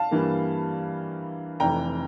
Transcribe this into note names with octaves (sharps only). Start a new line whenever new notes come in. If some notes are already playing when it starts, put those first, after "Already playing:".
Already playing: F5 A5
G2 E3 G3 A#3
F1 F2 E3 G5 A#5